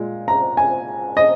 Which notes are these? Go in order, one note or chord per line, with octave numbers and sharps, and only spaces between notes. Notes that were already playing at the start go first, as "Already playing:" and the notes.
Already playing: A#2 G#3
A#5
G#5
D#5